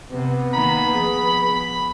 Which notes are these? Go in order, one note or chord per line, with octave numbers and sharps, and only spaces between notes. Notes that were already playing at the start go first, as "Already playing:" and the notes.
C3 B3
D#3 A#3 A#5 B5
F3 G#4
B5